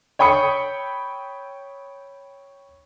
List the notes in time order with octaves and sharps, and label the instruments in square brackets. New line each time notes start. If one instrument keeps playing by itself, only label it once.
[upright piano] C#5 G5 B5 D#6 C#7